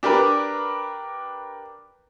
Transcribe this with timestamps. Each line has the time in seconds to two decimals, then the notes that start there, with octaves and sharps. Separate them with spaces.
0.03 D4 G4 A#4 B4